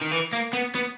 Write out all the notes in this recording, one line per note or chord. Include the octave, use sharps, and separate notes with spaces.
D#3
E3
A#3
B3
B3